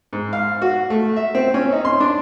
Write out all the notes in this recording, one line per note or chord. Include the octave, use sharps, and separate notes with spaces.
G#2
F5
F#4
A3
E5
C4
C#4
D#4
C6
D4